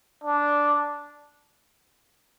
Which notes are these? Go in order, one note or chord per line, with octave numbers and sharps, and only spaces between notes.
D4